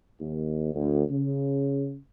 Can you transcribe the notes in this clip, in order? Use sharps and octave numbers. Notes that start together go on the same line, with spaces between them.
D#2
D2
C#3